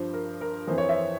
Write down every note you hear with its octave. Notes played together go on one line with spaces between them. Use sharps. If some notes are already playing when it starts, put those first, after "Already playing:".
Already playing: G2 F3 C5
A#4
A#4
F2 E3 C5
C#5
C5 E5